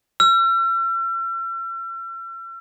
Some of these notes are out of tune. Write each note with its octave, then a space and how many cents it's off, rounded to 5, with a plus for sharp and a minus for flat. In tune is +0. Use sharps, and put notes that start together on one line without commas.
E6 +45